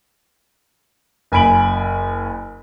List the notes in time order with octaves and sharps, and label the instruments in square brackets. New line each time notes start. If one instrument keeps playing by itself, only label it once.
[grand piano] F#1 G#5 B5 D7 F#7